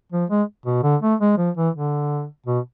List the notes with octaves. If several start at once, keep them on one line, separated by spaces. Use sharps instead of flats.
F3
G#3
B2
D3
A3
G#3
F3
E3
D3
B2